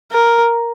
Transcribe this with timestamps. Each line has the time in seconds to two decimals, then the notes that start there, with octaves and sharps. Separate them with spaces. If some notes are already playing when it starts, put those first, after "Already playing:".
0.12 A#4